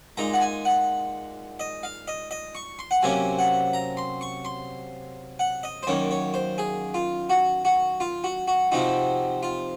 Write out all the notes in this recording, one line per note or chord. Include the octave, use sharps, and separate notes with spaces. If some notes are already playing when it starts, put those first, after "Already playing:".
A#2 G#3 D#4 A#5
F#5
G#5
F#5
D#5
F5
D#5
D#5
C#6
C6
F#5
C3 F#3 A#3 C#4 G#5
F#5
A#5
C6
C#6
C6
F#5
D#5
C5
F#2 D#3 A#3 C#5
C#5
C5
G#4
F4
F#4
F#4
F4
F#4
F#4
C3 F3 C4 D#4 F#4
F4